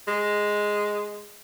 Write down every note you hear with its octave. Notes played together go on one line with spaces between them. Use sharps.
G#3